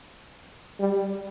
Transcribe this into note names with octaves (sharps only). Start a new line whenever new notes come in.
G3